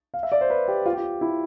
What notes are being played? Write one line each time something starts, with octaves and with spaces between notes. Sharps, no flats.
F5
E5
D5
C5
B4
G4
F4
G4
F4
E4